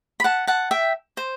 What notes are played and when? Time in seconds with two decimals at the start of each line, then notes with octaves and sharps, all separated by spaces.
0.20 B5
0.24 F#5 A5
0.47 F#5 A5
0.71 E5 G5
1.17 C5